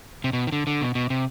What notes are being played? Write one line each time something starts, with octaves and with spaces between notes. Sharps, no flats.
C3
B2
D#3
D3
D3
B2
B2
C3